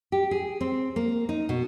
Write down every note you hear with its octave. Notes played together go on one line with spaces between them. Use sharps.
G4
G#4
C4
A#3
D#4
B2